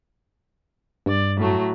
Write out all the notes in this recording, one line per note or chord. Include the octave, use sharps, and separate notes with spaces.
G2 D5
A2 F#3 A3